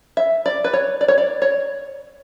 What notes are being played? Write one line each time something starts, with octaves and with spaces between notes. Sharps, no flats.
E5
D5
B4
C#5
D5
C#5
D5
C#5